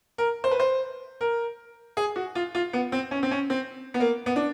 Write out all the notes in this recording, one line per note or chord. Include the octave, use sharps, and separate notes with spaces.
A#4
C5
B4
C5
A#4
G#4
F#4
F4
F4
B3
C4
C#4
C4
C#4
C4
B3
A#3
B3
D4